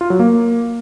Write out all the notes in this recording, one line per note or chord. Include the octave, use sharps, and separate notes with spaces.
F4
F#3
A#3